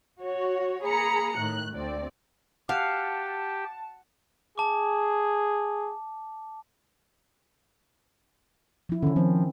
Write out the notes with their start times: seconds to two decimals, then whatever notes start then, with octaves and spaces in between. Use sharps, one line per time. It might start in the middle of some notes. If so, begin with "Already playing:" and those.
0.21 F#4 C#5
0.84 A#3 G#4 A#5 B5 C#7
1.37 A2 D#3 F#6
1.73 D2 C4 D5
2.69 G4 F5 F#5 A5
4.58 G#4 A5 D6
8.89 F3 E4
9.03 D3 D#3 C#4
9.16 F3 C4